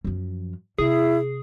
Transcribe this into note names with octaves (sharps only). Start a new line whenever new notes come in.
F#2 F3
C3 E4 G#4